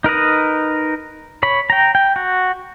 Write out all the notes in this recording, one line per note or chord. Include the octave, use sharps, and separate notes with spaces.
D#4 A#4 B4 D#5
C#5 B5
G5 A#5
G5
F#4